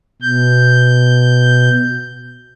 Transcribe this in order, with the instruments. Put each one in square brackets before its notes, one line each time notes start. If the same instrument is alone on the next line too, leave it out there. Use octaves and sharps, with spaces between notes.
[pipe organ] B2 G6